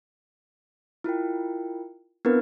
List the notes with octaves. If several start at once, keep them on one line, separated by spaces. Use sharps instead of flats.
E4 F4 A#4 G5
B3 C4 D4 E4 A#4 B4